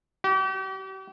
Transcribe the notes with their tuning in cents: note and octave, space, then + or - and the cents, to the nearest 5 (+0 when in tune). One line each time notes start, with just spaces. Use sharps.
G4 -40